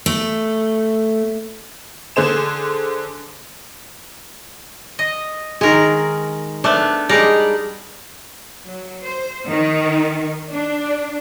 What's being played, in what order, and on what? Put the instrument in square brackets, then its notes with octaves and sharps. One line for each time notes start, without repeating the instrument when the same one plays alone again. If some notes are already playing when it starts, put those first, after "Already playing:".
[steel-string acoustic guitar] A3
[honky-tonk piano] D3 G#4 C5 E7
[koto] D#5
[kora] D#3 G#4 [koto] G#3 A#4
[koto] A3 B3 [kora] D4
[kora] G3 G#3 G#4 [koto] D#4 A#4 D5
[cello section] F#3
C5
D#3
D4